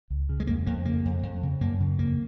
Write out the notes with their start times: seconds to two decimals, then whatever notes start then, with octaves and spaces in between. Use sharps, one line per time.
0.10 C#2
0.29 C#3
0.40 G#3
0.47 F2 A#3
0.66 F2 A#3
0.85 C#3 A#3
1.05 F2
1.23 F2
1.43 C#3
1.61 F#2 A#3
1.80 C#3
1.99 F2 A#3